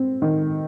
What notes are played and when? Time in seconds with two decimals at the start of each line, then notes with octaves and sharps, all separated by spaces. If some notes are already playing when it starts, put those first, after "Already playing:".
Already playing: C4
0.22 D#3